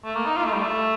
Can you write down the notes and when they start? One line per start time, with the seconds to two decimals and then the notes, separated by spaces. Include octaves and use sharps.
0.05 A3
0.15 A#3
0.26 D#4
0.37 F4
0.45 A3
0.53 G3
0.61 A3